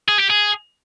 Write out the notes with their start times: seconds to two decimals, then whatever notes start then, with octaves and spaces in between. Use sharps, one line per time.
0.08 G#4
0.19 G4
0.30 G#4